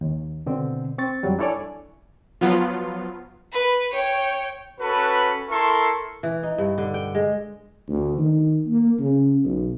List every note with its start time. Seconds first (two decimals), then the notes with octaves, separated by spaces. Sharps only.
0.01 D#2
0.46 B2 D3 C4
0.98 C4 C#6 A6
1.23 F2 F#3 G3
1.39 D4 E4 A4 C#5 D5 G#5
2.41 F3 F#3 B3 F4
3.52 B4
3.93 C#5 G5
4.80 C#4 F#4 A4 B4
5.49 E4 A4 A#4 A5 C6 C#6
6.23 E3
6.43 D#4
6.58 G2
6.78 D3
6.94 G5
7.15 G#3
7.88 D2
8.18 D#3
8.68 A#3
8.99 C#3
9.44 B1